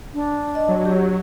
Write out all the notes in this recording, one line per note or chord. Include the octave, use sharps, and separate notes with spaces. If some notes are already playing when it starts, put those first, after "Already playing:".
D4
D#5
F#3
G4